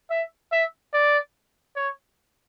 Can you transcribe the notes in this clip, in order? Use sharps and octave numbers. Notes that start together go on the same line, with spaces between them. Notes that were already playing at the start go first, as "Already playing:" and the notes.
E5
E5
D5
C#5